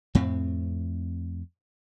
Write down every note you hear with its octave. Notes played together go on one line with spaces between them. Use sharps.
F2 A2 C4